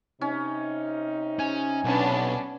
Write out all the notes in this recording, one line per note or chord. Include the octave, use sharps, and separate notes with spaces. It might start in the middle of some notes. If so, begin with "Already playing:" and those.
C3 C#4 D#4
C#4 G#5
B1 B3 C#4 D4